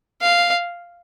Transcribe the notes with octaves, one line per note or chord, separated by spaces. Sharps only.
F5